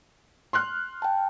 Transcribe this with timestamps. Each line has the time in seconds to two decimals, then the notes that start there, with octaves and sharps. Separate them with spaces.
0.53 C6 F6 F#6
1.02 G5 A5